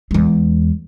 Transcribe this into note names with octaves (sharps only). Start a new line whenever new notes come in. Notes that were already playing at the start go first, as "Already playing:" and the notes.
E2 G#3